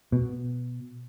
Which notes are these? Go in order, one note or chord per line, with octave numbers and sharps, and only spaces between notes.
B2